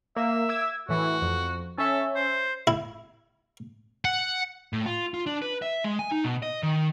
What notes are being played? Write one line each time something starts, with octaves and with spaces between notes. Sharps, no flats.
A#3 E5
D6 E6 G#6
A2 E3 F#4
F2
C#4 A4 E5
C5
E4
F#5
A2
F4
F4
D4
B4
E5
G#3
G#5
D#4
B2
D#5
D#3